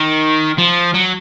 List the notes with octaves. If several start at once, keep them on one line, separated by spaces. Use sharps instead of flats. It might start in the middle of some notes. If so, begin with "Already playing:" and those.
Already playing: D#3
F3
F#3